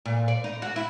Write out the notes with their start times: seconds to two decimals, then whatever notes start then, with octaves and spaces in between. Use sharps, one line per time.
0.05 A#2
0.28 D5
0.44 D#4
0.62 F#4
0.76 E4